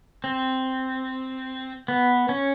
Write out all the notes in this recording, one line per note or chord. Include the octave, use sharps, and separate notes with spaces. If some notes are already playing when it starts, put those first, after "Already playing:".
C4
B3
C#4